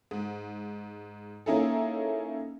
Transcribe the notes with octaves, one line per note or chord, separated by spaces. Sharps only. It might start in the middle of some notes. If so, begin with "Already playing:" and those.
G#2
A#3 C#4 D#4 E4 G#4 A4